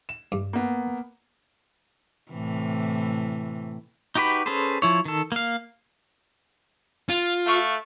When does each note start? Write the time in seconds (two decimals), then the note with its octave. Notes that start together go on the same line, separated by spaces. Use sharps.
0.09 E7
0.32 G2
0.53 A#3 B3
2.31 A2 C3 E3
4.15 D#4 F#4 G4 B4 B5
4.46 C#4 G#4 A4 B4 C5
4.82 F3 E4 C#5
5.05 D#3 A4
5.32 A#3 F5
7.09 F4
7.47 A3 F5 C#6